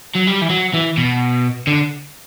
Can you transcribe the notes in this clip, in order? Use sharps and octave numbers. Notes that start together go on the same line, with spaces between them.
F#3
G3
E3
F#3
E3
B2
D3